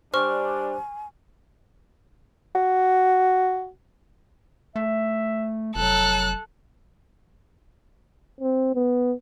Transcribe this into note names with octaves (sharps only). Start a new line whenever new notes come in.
G3 D4 C5 G#5 C#6 F6
F#4
A3 E5
F1 F#3 A4 F#6
C4
B3